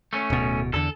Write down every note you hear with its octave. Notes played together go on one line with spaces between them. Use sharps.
A3 C#4
D1 B2
E2 D3 A4